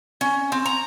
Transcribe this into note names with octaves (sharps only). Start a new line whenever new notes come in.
C#4
C4
A#5